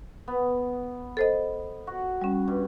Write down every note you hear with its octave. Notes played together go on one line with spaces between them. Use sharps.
B3
A4 C5 D#5
F#4
G3 C#4
G2